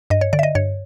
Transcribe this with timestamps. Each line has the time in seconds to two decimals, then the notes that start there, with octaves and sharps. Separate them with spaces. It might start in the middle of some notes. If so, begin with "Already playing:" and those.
0.10 G2 D#5
0.21 C#5
0.33 D3 D5
0.39 E5
0.43 D#5
0.55 G2 C#5